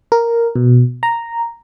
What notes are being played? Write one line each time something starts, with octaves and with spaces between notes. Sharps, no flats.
A#4
B2
A#5